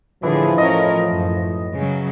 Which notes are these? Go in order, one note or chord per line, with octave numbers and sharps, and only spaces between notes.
A2 D3 E3 F3 G#4
E3 C#4 A#4 D#5
F#2
C#3 F#3